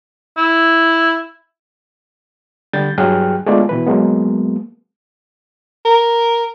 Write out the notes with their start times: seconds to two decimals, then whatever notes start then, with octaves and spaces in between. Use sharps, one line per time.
0.37 E4
2.73 D3 G3 G6 A6
2.98 G2 F#3 G#4 G5 F6 F#6
3.46 G#3 A3 B3 D4 F4 D5
3.69 B2 E3 B4
3.87 F#3 G#3 A#3 B3
5.85 A#4